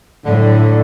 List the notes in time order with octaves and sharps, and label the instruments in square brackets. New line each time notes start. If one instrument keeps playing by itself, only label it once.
[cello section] A2 F#3 [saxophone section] D3